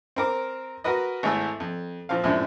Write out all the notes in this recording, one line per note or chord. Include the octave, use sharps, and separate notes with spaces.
C4 A#4 D6
F#4 A#4 B4 D#5
G#1 G#2 A3 E4 E6
F2
A#2 F3 C4 F5
F#2 A2 C3 F3 G#3 D4